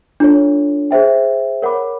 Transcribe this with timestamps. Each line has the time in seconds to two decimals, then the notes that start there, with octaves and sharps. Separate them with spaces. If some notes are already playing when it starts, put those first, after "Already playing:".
0.20 D4 F4 A4 C#5
0.91 G#4 C5 E5 G5
1.62 A#4 C#5 F#5 B5 D6